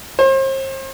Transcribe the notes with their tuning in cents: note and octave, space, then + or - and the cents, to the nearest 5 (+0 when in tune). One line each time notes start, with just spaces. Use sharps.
C5 +40